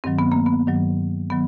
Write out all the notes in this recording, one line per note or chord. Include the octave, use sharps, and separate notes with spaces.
G2 D#3 F#3 C4
B3
A#3
B3
G2 D#3 F#3
D#3 F#3 B3